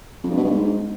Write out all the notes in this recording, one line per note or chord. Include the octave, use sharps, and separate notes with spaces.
F2
G2
B2
G2
G#2